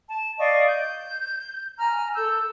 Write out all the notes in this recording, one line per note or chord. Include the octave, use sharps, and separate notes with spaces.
A5
D5 D#5 F5 C#6
G6
G#5 A#5 F6
A4 E6 G6